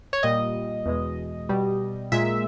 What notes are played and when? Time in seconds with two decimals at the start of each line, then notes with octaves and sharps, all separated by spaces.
0.13 C#5
0.23 A#2 G3 D#5
0.86 E2 B2 G#3
1.49 B2 G3
2.12 A#2 G#3 E5